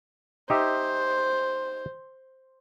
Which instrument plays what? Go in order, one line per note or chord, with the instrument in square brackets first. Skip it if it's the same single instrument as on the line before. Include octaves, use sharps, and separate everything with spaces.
[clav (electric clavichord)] D#4 G4 E5 [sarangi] C5